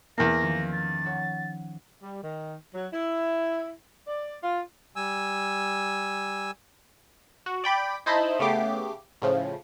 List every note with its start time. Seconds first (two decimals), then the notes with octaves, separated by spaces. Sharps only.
0.18 E2 A#3 D#6 A#6
0.42 D#3 F3 C#4
0.73 A6
1.05 C#5 F#5 E6
2.02 G3
2.23 D#3
2.74 F#3
2.93 E4
4.07 D5
4.43 F4
4.96 G3 G#5 E6
7.46 F#4
7.64 D5 G5 B5 D6
8.06 D#4 E4 C5 D#5 A5 B5
8.39 C#3 A3 B3 G4 D6 C7
9.22 A2 C#3 F3